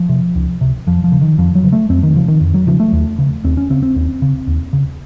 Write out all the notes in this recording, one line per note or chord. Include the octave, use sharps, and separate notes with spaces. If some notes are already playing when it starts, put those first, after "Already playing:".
Already playing: F3
C3
C#2
C3
F2 F3
F3
C#3
D#3
F2 F3
F#3
C#3
A3
F2 C4
D#3
C#3 F3
D#3
F2
F#3
C#3 F3
A3
D#2
C#3
D#2 C4
C#4
C#3 C4
C4
D#2
C#3
D#2
C#3